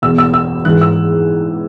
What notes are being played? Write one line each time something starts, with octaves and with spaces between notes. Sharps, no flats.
E2 B2 E6
E6
E6
G#2 E3 F#6
E6